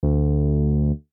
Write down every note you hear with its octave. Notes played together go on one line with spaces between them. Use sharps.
D2